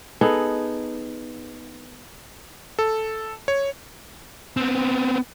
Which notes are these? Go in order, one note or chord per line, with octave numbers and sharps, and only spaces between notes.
B3 D#4 G#4 A4
A4
C#5
B3 C4